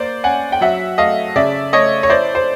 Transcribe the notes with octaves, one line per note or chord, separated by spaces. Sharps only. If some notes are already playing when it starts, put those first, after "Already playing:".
Already playing: A#3 C5 D5
C#4 F#5 G#5
G5
F#3 E5 F#5
A3 D#5 F5
C#3 D5 E5
A3 C#5 D#5
C#5
E4 C5 D5
C5